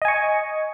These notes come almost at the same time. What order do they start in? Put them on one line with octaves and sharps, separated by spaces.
D#5 G#5 C#6